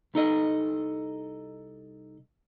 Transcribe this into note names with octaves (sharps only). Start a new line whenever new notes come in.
C2 D#4 A4 D#5